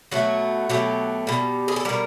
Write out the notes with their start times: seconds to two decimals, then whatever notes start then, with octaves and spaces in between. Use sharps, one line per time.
0.11 B2 F#3 A3 F#4
0.69 B2 F#3 A3 G4
1.27 B2 G3
1.68 G#4
1.76 A4
1.85 B2 G3 A#4